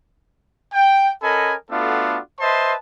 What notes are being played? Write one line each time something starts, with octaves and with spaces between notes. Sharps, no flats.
G5
C#4 A4 A#4 D#5 G#5 B5
A3 B3 D4 F4 F#4 A4
B4 C5 D#5 E5 A5 C6